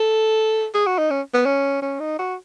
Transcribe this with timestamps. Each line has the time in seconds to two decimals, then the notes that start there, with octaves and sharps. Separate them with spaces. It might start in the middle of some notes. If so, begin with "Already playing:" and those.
Already playing: A4
0.74 G#4
0.86 F#4
0.99 D#4
1.10 C#4
1.34 B3
1.46 C#4
1.82 C#4
2.00 D#4
2.19 F#4